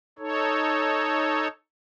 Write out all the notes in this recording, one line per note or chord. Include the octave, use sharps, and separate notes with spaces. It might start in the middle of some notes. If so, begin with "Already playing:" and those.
D#4 A4 C#5